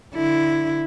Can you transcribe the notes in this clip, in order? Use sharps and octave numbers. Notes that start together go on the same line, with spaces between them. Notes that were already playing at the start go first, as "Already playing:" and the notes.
D3 E4